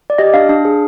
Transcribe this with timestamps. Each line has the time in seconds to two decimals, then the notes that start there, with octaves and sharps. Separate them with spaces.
0.10 D5
0.18 G4 D#5
0.34 D4 F5
0.49 D4 F5
0.65 G#4